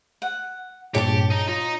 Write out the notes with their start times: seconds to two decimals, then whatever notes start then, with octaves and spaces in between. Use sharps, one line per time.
0.22 F#5
0.95 G2 A#2 G4 G#4 C#5 A5 D6
1.31 D#4
1.49 D#4 F4